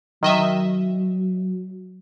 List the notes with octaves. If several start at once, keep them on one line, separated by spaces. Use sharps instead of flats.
D#3 F#3 D#5 E5